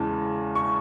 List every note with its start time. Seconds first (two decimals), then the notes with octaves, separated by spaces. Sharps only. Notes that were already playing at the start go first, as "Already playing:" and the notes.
Already playing: E2 C#3 E3 G#3 C#4 A5
0.55 C#6